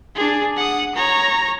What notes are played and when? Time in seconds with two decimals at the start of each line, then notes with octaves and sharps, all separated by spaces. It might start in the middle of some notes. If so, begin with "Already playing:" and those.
0.15 D4 G#4
0.56 F#5 D#6
0.95 C#5 A#5